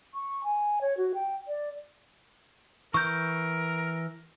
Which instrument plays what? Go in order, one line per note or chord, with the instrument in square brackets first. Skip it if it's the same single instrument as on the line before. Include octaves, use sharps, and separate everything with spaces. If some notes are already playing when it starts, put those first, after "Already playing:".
[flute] C#6
G#5
C#5
F#4
G5
D5
[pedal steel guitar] E3 G6 [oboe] A#4 [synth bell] C#6